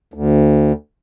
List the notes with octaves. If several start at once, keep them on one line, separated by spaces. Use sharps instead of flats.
D2